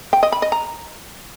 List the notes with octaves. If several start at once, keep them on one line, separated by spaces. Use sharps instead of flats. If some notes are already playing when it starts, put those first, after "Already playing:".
G5
D#5
B5
D#5
A#5